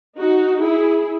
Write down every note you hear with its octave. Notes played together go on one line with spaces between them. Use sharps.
D#4 F#4
E4 G#4